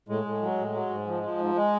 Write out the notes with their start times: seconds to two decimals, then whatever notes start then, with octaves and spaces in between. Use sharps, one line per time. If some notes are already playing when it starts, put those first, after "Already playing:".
0.08 A2 G#3
0.25 A2
0.41 F#3
0.58 A2
0.74 F#3
0.90 G#2
1.07 F3
1.23 F3
1.38 G#2
1.55 G#3